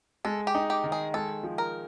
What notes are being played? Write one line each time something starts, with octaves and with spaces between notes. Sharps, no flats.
G#3 A4
G4
D#4
G4
D#3
G#4
G#3 A4
F3
A#4